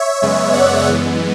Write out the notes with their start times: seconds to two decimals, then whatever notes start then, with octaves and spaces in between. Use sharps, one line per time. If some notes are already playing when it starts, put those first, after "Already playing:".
Already playing: C#5 E5
0.22 F#2 C#3 G#3 B3
0.53 D5 F#5
0.87 F#2 E3 G#3 B3